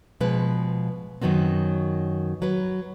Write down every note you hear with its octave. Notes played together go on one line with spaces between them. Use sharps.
B2 F3 G#3 B4
F#2 D#3 F#3 B3 C4
F#3 B4